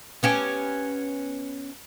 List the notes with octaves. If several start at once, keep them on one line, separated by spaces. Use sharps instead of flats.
B3 C#4 G4